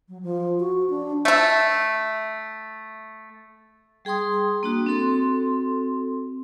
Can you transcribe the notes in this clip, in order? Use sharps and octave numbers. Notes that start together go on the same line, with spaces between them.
F#3
F3
F#4
D4
A3 E5
G3 G#4 G5 C6 D#6
A#3 D4 F#4
C4 F#4 A4 C6